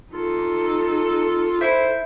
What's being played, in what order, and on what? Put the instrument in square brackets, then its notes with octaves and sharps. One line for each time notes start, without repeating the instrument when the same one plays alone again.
[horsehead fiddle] D#4 A4 [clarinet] F4
[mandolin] E4 [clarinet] C5